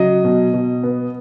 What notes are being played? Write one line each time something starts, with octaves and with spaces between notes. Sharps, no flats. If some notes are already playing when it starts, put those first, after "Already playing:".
Already playing: C#3 F#3 D#5
B2
B2
B3